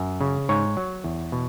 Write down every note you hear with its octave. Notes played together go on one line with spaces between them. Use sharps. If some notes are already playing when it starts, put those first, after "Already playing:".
Already playing: F#2
C#3
G#2 C#5
F#3
E2
B2